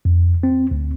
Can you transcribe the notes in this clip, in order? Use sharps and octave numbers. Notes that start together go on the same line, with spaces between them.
F2
C4
D2